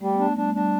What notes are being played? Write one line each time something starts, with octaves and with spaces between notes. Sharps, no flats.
G3 A3
B3
D4
A3
G3 D4
A3
G3 D4